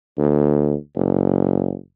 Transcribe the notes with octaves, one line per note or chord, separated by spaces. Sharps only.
D2
F#1